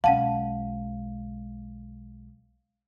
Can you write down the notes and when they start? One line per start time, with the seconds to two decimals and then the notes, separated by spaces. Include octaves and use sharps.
0.04 B1 G#3 C#4 F5 F#5 A5